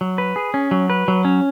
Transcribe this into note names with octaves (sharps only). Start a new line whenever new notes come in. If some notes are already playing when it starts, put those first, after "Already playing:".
F#3
B4
G#4
C#4
F#3
B4
F#3
C#4